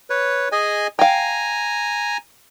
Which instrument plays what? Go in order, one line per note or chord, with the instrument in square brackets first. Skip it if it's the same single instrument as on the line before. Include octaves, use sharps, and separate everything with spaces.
[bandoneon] B4 C#5
G#4 D#5 G#5
[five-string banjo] F5 G5 [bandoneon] G#5 A#5